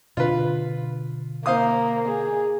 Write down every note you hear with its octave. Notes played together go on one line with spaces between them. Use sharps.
B2 D3 D4 F4 B4
A#3 C5 F5 D#6
G#4